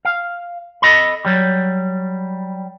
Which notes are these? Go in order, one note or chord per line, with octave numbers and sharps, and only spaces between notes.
F5
A4 D#5 B5
F#3 G3